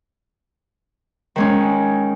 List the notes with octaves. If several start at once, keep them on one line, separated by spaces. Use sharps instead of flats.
D#3 G#3 C#4